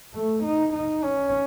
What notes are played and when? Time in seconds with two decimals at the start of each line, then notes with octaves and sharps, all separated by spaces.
0.14 A3
0.44 D#4
0.74 D#4
1.04 C#4